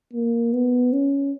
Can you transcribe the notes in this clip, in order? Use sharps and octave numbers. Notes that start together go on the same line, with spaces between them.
A#3
B3
C#4